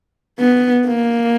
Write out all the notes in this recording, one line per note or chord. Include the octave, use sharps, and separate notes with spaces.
B3
A#3